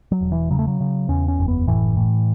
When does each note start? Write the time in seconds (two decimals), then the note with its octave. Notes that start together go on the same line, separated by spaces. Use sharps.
0.12 F#3
0.21 E1
0.32 E3
0.51 C#3 F#3
0.59 A3
0.67 F#3
0.80 C#3
1.08 E2 C#4
1.28 C#4
1.38 F#1
1.48 B3
1.67 A2 E3
1.97 A2